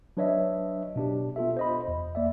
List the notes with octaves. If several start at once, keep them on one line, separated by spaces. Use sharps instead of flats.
F#3 D4 B4 C#5 D#5 E5
B2 D4 G4
B3 F4 A4 E5
C5 D#5 B5
E2
A#3 D5 E5